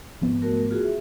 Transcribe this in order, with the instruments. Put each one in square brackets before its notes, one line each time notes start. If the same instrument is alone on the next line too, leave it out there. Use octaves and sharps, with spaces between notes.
[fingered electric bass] G#1 F3 B3
[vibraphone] A3 F#4 A#4
F4 F#4 G#4
E5